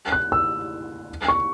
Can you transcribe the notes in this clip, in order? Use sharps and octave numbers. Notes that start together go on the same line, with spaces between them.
F#6
E6
C#6